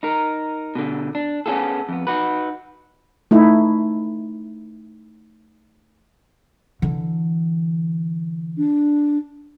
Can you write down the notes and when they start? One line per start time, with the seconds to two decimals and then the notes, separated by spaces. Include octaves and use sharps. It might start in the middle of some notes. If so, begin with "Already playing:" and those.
0.03 D#4 A#4
0.75 B2 D3
1.15 D4
1.46 B3 C#4 D4 F4 G#4 A4
1.89 F2 B3
2.07 D#4 F#4 B4
3.31 A3 D#4 E4
6.82 D3 E3
8.57 D4